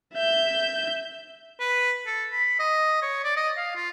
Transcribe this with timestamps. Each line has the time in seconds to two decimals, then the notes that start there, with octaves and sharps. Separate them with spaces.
0.14 E5 G6
1.60 B4
2.07 A4
2.32 B5
2.60 D#5
3.02 C#5
3.24 D5
3.37 D#5
3.57 F5
3.76 F4